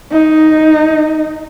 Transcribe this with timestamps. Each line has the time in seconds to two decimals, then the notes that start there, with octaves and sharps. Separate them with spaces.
0.12 D#4